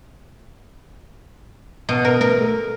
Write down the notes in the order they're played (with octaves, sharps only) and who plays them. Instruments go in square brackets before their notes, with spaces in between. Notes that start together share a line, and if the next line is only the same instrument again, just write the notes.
[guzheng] B2
[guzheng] A#4 [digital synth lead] B4
[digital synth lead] A3 [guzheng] A#4
[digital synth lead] A4